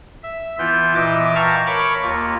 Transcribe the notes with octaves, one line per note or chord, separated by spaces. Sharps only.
E5
E3 B3 E4 F4 G6
A#2 E3 D#5 E5 D6
F5 G5 A5 A#5 C#6 F6
A#4 C#5 B5 C#6 D6
D#2 A#3 F4